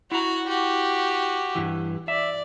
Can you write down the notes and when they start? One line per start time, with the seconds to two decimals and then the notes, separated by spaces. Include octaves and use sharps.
0.12 E4 F#4 F#5 A#5
0.47 F#4 G4
1.55 G2 E3
2.08 D5 E5